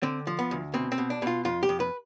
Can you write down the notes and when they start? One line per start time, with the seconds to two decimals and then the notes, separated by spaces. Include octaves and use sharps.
0.03 D3 C4
0.27 F3
0.39 B3
0.51 D2
0.74 B2 C4
0.92 C4
0.98 B2
1.10 D4
1.22 B2 F4
1.45 F2 F4
1.63 G4
1.69 F2
1.80 B4